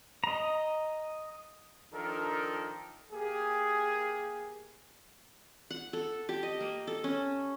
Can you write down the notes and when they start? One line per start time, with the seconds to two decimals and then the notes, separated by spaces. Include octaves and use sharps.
0.24 D#5 A#5
1.94 D#3 F3 D4 A4 A#4
3.13 A#3 G4 G#4
5.70 F#5
5.93 A4
6.29 G4
6.43 D#5
6.60 A#3
6.87 A4
7.04 C#4